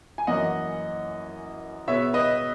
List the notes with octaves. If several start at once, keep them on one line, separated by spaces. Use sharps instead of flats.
G#5
F#2 E3 A#3 C#4 D#5 F#5
B2 G#3 B3 C#5 E5
B4 D#5